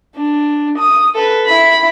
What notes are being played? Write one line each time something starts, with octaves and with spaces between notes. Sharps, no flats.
D4
D#6
A4 B4
E4 B5